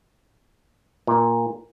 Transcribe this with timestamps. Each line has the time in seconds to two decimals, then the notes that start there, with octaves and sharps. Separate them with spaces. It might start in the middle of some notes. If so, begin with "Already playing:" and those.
1.07 A#2